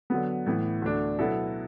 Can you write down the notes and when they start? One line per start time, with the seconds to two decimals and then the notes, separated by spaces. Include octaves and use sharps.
0.10 D3 F#3 B3
0.46 A2 E3 B3
0.82 D2 D3 A3 D4
1.19 B2 F#3 B3 E4 A4